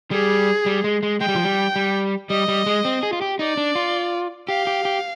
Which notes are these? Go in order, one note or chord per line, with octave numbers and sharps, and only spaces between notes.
G3 G#4
G3
G#3
G#3
G#3 G5
G3
F3
G3
G3
G3 D#5
G3
G#3
C4
G#4
F4
G4
D#4 D5
D4
F4
G4 F5
G4
G4